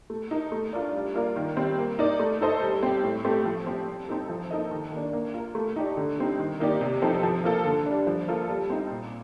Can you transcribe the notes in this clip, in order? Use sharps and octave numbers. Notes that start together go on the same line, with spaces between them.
A3
D#4 A#4
A3
D4 F4 A#4 D5
G3
A#3 F4 A#4 D5
D#3
G3 C4
A#3
D#4 A#4 D5
A3
D#4 A4 C5 D#5
G3
C4 G4
A2
A3 C4 G4
F3
C4 G4
G3
C4 D#4 A4
F3
A#3 D#4 A4 D#5
D#3
A#3 D4
A#3
F4 A#4
A3
D#4 G4 D5
D3
G3 C4 D#4
D#3
A#3 D#4 G4 D5
C3
F3 C4 D#4 A4
F3
A#3 F4 A4
D3
G3 D4
F3
A#3 F4 A4
G3
C4 D#4
A#2